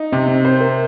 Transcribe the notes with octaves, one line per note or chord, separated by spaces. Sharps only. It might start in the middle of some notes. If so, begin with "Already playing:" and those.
Already playing: D#4
C3 C4
C4
C5
A#4